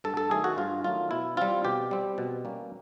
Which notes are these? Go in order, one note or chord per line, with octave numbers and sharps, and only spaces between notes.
G2 A4
A4
D#3 F#3 A3 G#4
F#4
G2 F4
D#3 F#3 A3 F4
B2 E4
G3 C4 F4
B2 G4
G3 C4
B2
G3 A#3 C#4